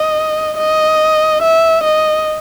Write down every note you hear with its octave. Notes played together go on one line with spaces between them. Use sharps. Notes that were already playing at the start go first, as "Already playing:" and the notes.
Already playing: D#5
D#5
E5
D#5